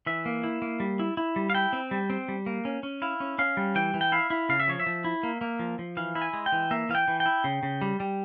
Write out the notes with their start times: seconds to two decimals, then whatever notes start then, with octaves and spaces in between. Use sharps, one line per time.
0.06 E3 E5
0.26 A#3
0.43 E4
0.62 A#3
0.80 G3
0.99 E4
1.17 E4
1.36 G3
1.50 F5
1.54 E4 G5
1.73 C4
1.91 G3
2.10 C4
2.28 G3
2.46 A#3
2.65 C#4
2.83 C#4
3.02 E4 F5
3.20 C#4
3.39 C#4 F5
3.57 G3
3.75 E3 G5
3.94 E3
4.01 G5
4.12 E4 F5
4.30 E4
4.49 C#3 F5
4.60 E5
4.68 F3 C#5
4.80 E5
4.86 F3
5.04 E4
5.23 A#3
5.41 A#3
5.59 F3
5.79 F3
5.97 E3 F5
6.15 E4
6.22 G#5
6.33 G#3
6.46 G5
6.52 E3
6.71 A#3 E5
6.89 E3 F5
6.95 G5
7.08 E3
7.20 G5
7.26 E4
7.44 C#3
7.63 C#3
7.82 G3
8.00 G3